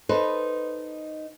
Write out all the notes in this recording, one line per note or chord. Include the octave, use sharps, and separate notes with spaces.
D#4 A4 B4 C5 D#5